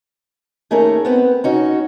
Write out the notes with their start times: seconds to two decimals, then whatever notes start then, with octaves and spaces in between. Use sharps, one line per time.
0.71 D#2 A3 C#4 D#4 G#4 A#4
1.05 B3 C4 B4
1.44 C#4 D#4 F#4